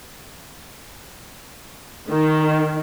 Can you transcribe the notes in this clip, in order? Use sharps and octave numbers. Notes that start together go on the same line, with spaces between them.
D#3